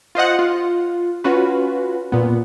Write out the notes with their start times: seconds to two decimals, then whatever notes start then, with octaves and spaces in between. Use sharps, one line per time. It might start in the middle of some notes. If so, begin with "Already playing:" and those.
0.15 F4 C5 D#5 F#5
0.39 F4
1.24 C#4 F4 F#4 B4
2.12 A#2 B3